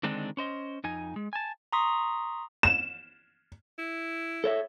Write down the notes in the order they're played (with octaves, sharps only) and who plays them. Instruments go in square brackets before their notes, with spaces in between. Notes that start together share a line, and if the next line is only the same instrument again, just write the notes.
[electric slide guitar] D3 D#3 G#3 C4 D4 D#4
C#4 C5 D#5
F2 D#4 G#5
G#3
G#5 A5
[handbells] A#5 C6 C#6 D#6 B6
[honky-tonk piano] E7
[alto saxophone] E4
[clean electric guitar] A4 C#5 E5